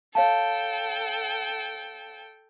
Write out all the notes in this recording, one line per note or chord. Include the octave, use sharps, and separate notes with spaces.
A4 C#5 F5 G5 A5